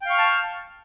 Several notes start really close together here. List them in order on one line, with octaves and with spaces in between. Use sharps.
G5 F5 C#6 F6 A5